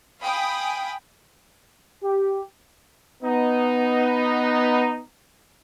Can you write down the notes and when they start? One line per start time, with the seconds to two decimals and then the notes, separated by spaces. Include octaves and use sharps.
0.21 F5 G5 G#5 B5 D#6
2.04 G4
3.23 B3 D#4